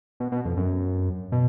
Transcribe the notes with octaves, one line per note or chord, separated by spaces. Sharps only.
B2
B2
F2
F#2
B2